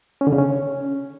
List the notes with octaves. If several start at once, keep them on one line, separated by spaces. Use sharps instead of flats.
C#4
D3
C#3
C#4